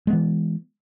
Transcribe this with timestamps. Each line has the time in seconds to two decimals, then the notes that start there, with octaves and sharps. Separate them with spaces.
0.07 G#3
0.10 B3
0.13 E3